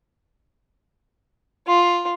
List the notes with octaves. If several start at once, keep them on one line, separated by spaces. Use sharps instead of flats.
F4